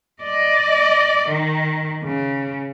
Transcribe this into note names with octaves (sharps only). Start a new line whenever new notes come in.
D5 D#5
D#3
C#3